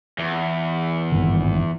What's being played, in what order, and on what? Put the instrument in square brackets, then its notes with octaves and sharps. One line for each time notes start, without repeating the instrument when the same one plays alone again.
[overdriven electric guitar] E2
[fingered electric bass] G#1 G2 D#3